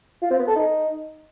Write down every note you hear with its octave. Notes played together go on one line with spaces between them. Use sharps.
F4
C4
B3
A4
D#4